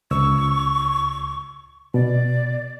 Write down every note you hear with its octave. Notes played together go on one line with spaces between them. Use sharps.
C#2 C#6 E6
B2 D5